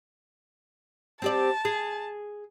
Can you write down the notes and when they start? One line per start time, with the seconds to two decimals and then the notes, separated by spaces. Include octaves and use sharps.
1.22 C4 G4 D5 A5
1.65 G#4